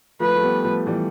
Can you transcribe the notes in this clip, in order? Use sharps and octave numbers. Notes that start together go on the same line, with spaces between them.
F3 A3 B4
A3
G3 B3
F3 A3
E3 G3